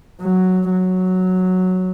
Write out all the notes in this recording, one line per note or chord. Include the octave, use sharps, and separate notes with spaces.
F#3
F#3